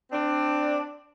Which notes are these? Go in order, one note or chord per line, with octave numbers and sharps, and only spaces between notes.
C4 D4